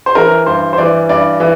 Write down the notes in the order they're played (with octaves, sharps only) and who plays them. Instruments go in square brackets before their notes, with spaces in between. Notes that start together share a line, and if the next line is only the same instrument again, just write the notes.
[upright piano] C5
E3 A#4
G2 C5
C5
E3 D5
G2 D5
E3